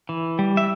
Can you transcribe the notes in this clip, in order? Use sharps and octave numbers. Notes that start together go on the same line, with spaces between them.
E3
G3
E5